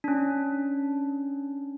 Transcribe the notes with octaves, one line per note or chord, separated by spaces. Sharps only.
C#4 D4